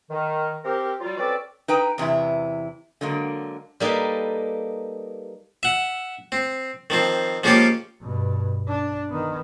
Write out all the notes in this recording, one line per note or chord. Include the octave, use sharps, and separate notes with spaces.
D#3
C4 G4 A#4
F#3 G3 F4
C4 C#4 F#4 A4 B4 D5
D#4 B4 G5 A#5
E2 C3 E3 E4
D3 F#3 G#3 A#3
G3 A#3 D#4 G4 A4 B4
E5 F#5
C4
D#3 F3 C4
F3 G#3 A#3 C#4 F4 G4
G2 B2
D4
D#3 B3